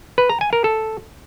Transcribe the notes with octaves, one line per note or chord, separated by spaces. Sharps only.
B4
A#5
G#5
A#4
A4